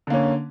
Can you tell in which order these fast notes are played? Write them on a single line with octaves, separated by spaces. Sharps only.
D3 A#3 C#4